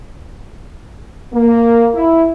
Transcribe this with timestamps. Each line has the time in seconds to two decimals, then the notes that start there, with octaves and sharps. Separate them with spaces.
1.33 A#3
1.94 E4